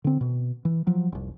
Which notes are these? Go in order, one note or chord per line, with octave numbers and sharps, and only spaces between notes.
D3 C4
B2
E3
F3 F#3
F1 C2